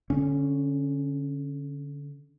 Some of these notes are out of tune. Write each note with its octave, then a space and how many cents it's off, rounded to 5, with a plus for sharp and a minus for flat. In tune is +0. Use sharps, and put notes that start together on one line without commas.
D3 -25 C#4 +0